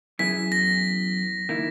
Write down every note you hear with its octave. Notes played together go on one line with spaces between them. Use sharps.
F#2 E3 B3 E4 G#4 B6
A#6
D#3 A#3 E4